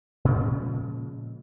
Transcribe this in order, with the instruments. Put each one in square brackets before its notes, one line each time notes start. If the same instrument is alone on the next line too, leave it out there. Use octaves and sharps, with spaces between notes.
[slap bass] A#2 C#3 F3 G#3